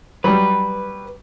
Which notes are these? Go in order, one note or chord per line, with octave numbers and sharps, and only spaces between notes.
F#3 G3 B4